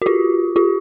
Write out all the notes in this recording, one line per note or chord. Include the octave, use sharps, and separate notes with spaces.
F#4
F4 G4
F4 G4